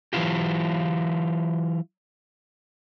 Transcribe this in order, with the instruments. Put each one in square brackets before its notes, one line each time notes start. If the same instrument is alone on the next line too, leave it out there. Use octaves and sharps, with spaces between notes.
[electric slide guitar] E3 F#3 E4 F4 G4